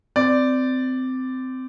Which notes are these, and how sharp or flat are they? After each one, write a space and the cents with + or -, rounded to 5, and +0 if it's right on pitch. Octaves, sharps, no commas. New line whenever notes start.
C4 -20 D5 +0